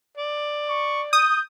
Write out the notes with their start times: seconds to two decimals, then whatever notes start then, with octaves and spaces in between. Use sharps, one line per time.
0.17 D5
0.70 C#6
1.13 D#6 G6